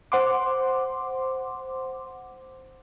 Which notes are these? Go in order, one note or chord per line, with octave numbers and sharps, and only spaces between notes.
C5 F#5 C6 D6